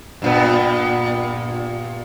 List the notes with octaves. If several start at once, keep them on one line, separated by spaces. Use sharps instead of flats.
G2 A#2 B3